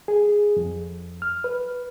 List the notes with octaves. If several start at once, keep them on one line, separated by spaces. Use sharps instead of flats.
G#4
F2
F6
B4